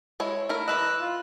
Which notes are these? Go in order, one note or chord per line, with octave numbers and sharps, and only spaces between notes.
G#3 E4 C#5
A3 E4 A#4
E3 B4 D#5 E6 F#6
F4